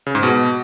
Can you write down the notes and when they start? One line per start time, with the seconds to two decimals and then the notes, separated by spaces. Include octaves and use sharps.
0.07 C#3
0.15 G#2
0.23 B2